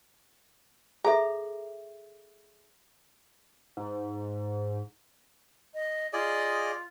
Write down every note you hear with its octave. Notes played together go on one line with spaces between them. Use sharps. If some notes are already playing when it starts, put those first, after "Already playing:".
G#4 A4 E5 A#5
G#2
D#5
F4 G#4 D5 D#5